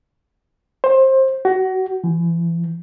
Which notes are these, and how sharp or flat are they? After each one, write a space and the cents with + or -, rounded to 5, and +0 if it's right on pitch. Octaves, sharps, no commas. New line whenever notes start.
C5 +25
F#4 +25
E3 +35